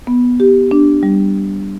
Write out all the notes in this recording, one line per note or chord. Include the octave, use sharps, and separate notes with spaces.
B3
G4
D4
G3